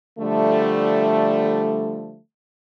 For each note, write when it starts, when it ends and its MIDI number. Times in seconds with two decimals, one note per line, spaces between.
0.19 2.17 50
0.19 2.17 53
0.19 2.17 55
0.19 2.17 57